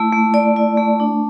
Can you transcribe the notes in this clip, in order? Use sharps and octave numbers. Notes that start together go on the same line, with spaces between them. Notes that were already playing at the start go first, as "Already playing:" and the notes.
Already playing: A3 E4
A3
D5
E4
A3
D4